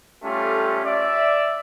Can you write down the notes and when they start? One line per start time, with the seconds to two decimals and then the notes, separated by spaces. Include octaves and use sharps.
0.22 G3 A3 C#4 F4 G4 A4
0.85 D5 E5